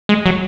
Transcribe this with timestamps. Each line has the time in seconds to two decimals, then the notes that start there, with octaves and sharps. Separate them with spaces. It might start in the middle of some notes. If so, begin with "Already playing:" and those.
0.09 G#3
0.26 F#3